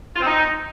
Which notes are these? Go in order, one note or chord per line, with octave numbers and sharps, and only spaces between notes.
F4
C4
D#4